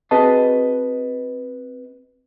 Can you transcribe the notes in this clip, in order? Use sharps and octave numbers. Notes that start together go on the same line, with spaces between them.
C4 F#4 G#4 B4 D#5 A5